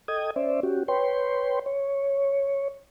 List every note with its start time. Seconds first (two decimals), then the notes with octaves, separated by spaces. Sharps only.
0.08 A4 D#5 G5 D#6 G#6
0.36 C#4 C5 D5 E5
0.63 C#4 F#4 G4
0.88 B4 C#5 G5 C6
1.66 C#5